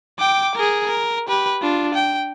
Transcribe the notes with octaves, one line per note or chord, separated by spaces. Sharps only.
G5 D6
G#4 A#4
A#4
G4 B4
D4 F4
G5